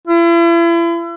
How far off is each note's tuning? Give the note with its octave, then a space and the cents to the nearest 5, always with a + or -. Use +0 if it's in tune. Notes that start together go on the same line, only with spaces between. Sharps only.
E4 +40